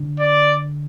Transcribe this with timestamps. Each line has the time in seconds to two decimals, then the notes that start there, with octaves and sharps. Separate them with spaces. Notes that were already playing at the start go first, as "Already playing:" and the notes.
Already playing: D3
0.19 D5